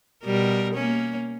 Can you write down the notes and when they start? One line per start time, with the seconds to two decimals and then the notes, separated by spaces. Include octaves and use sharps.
0.24 B2 G3 A#4
0.74 A#3 C#4